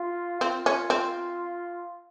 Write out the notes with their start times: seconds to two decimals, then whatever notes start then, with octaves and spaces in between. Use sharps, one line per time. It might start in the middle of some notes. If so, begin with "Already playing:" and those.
Already playing: F4
0.41 C4 F4
0.66 C#4
0.90 C4